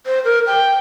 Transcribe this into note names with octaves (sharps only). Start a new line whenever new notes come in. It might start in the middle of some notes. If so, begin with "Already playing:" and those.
C5
A#4
G5